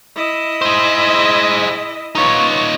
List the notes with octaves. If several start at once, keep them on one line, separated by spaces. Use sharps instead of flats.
E4 D#5
G#4 C5
D#4 F4 B4 C#5